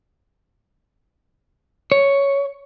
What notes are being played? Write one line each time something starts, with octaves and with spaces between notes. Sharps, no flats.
C#5